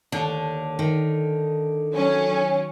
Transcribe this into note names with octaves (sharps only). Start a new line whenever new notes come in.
D#2 D3 A4
D#3
F#3 C#4